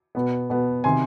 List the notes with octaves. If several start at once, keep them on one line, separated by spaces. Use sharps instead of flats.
B2 B3
B2 B3
C3 D#3 G#5 C6